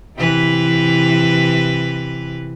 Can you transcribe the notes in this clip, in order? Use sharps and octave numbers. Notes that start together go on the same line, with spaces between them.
C3 E3 B4